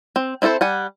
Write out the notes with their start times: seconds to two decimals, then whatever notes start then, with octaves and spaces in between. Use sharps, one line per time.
0.16 C4
0.42 C4 E4 F#4 A4 C5
0.61 G3 F#5 G#5